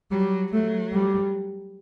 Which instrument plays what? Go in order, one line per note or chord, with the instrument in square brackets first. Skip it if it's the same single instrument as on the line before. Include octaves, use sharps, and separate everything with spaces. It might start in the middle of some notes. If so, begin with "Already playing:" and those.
[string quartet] F#3 [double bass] G3
[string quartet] F#3 [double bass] A3
[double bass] G3